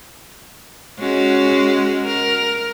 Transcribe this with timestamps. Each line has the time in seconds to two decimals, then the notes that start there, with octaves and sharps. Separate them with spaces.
0.99 G#3 C#4 F#4
2.06 A#4